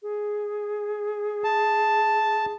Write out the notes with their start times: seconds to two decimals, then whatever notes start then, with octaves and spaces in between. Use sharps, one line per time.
0.03 G#4
1.44 A5